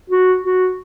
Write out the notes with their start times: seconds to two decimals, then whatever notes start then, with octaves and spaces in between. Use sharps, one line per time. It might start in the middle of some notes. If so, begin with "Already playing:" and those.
0.10 F#4
0.44 F#4